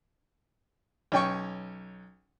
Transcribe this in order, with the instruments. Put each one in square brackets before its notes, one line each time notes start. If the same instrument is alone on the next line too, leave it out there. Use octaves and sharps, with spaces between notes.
[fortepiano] B1 C#4 G5 C#6